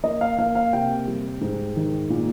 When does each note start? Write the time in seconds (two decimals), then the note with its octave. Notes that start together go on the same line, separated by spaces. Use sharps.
0.04 A#3 D#5
0.21 F5
0.38 A#3 F5
0.55 F5
0.73 C3 G5
1.07 G3
1.42 G#2
1.76 D#3
2.10 A#2